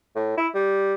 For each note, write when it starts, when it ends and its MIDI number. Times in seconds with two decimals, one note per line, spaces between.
0.15 0.36 45
0.37 0.48 64
0.54 0.95 55